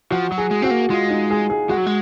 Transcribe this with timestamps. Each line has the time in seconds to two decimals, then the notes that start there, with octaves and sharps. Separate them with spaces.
0.11 F3 F#4
0.32 F#3
0.38 G#4
0.51 G#3
0.62 C4 F#4
0.71 A#3
0.90 G#3 F4
1.10 D#4
1.31 G#4
1.50 G#4
1.69 G#3 F#4
1.77 F#3
1.86 G#3